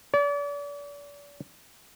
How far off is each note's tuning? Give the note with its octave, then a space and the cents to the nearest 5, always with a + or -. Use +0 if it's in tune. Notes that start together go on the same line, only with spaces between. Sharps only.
D5 -40